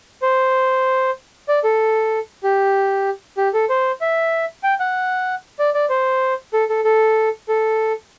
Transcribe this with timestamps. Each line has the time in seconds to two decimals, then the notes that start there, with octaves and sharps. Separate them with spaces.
0.22 C5
1.48 D5
1.64 A4
2.43 G4
3.37 G4
3.54 A4
3.69 C5
4.01 E5
4.63 G5
4.80 F#5
5.59 D5
5.74 D5
5.89 C5
6.53 A4
6.69 A4
6.84 A4
7.48 A4